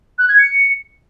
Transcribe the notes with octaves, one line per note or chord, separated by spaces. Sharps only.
F#6
G#6
C#7